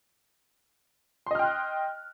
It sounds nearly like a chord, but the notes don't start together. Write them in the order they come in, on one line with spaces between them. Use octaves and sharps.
C6 D#5 F6 G5 F#6